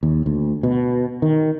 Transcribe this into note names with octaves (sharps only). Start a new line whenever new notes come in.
D#2
D2
B2
D#3